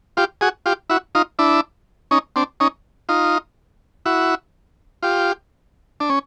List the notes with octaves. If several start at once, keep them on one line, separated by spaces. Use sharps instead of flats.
F4 G4
F#4 G#4
F4 G4
E4 F#4
D#4 F4
D4 E4
C#4 D#4
C4 D4
C#4 D#4
D#4 F4
E4 F#4
F4 G4
D4
C#4